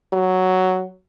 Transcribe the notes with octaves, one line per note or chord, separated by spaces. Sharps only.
F#3